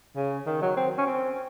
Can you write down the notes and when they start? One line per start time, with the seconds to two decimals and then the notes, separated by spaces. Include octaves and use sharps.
0.16 C#3
0.46 D#3
0.62 F#3
0.77 C4
0.98 C#4
1.07 C4